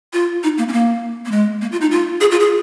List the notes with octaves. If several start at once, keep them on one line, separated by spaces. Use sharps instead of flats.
F4
D#4
A#3
C#4
A#3
A#3
G#3
A#3
F4
D#4
F4
G#4
F4
G#4